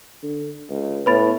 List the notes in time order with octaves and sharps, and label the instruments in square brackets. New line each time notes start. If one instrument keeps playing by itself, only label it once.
[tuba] D3
C#2
[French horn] A2 [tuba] B3 [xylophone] B4 B5 A6